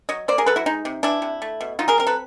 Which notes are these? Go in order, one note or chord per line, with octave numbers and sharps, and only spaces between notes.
F#3 C#5 D#5
A#3 C5 D5
G#4 A#4
F#3 A4 B4
E4 F#4
G#3 D#4
C3
E3 D4 E4
C3
A3
B2
F#3 D#4 F4
G#4 A#4
C4 A#4
A4 B4